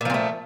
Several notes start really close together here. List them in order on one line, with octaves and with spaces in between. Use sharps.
A#2 F3 C4 A3